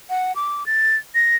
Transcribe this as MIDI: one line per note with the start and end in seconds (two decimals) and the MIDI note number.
0.10 0.35 78
0.36 0.66 86
0.66 0.96 93
1.15 1.36 94